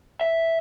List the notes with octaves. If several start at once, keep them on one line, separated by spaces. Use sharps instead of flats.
E5